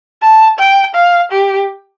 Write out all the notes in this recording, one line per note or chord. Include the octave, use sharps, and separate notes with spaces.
A5
G5
F5
G4